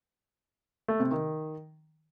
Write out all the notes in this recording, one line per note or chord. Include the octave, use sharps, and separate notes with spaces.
A3
C3
D#3